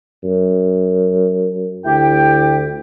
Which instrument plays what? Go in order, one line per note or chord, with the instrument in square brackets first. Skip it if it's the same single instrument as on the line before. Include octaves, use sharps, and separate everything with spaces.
[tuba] F#2
[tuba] D2 [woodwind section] E4 G4 G5